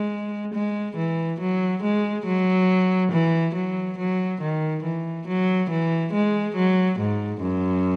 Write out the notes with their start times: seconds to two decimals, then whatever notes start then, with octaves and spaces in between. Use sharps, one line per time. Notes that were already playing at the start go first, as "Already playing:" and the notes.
Already playing: G#3
0.54 G#3
0.97 E3
1.40 F#3
1.83 G#3
2.26 F#3
3.12 E3
3.55 F#3
3.98 F#3
4.42 D#3
4.84 E3
5.27 F#3
5.70 E3
6.13 G#3
6.56 F#3
7.00 G#2
7.42 F#2